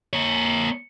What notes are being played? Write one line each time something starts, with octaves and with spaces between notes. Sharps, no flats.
A#3 C#5